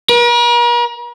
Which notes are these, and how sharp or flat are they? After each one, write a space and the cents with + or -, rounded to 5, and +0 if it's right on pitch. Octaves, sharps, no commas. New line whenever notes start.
A#4 +45